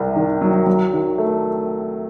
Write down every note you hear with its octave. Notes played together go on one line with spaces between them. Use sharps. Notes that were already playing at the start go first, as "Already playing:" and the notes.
Already playing: C2 C3
D#3
F#3
F#3
D#3
A3